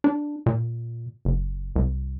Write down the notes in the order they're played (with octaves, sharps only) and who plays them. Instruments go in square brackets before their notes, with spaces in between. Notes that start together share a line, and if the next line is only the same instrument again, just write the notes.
[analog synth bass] D4
A#2
F#1
C2